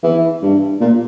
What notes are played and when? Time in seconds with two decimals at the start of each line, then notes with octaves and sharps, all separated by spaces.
0.03 E3
0.42 G2
0.81 A#2